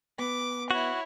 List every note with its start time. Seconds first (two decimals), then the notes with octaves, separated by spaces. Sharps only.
0.19 B3 D6
0.71 E4 F#4 C#5